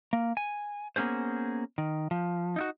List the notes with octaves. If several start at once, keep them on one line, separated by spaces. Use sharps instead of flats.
A#3
G#5
A#3 B3 C#4 G#4 C5
D#3
F3
D#4 E4 F#4